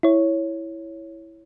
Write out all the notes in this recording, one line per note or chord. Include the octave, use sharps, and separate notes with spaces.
E4 C#5